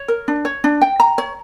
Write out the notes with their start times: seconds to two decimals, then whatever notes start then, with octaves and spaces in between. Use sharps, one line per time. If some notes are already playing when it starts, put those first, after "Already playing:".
Already playing: C#5
0.08 A#4
0.28 D4
0.45 C#5
0.64 D4
0.82 G5
1.00 A#5
1.18 C#5